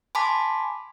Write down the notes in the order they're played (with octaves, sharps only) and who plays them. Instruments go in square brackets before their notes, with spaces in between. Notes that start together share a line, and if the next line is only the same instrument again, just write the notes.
[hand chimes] G#5 A5 B5 C6 D6 B6